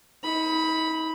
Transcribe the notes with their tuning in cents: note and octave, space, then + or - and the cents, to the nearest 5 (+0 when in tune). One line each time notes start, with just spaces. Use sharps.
D#4 +40 B5 -5